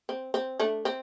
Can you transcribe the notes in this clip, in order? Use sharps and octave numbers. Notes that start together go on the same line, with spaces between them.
C4
C4
A3 D4
C4